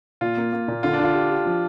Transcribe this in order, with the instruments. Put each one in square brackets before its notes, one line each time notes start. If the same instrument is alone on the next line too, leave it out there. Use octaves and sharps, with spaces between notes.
[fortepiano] A#2 [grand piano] F4
[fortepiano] A#3
A#3
A#2
[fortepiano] D3 [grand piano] F4
[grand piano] D4
[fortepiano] D3 [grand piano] F4
[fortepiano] G4
G4
F3